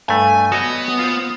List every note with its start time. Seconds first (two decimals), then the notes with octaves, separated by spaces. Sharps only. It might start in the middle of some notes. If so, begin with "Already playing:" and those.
0.09 G2 A3 G#5
0.52 B3 F#4 C#5 D#5
0.99 F4 C5